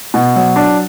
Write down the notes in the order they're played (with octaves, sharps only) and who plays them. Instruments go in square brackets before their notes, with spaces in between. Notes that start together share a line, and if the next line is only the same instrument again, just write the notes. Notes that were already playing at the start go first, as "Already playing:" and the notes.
[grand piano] B2
F#3
D4